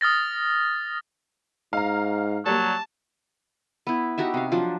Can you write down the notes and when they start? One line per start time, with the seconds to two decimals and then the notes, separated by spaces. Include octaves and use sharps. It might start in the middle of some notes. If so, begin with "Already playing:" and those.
0.01 D#6 F6 A6 A#6
1.73 G#2 F5 A#5
2.46 F#3 G3 A#3 A5
3.87 B3 E4
4.18 D#4 F#4 G4 E5
4.34 C3 F5
4.52 F3 F#3 D4